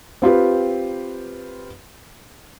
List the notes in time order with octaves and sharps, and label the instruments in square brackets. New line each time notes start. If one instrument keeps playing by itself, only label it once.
[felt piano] C4 F4 G4 B4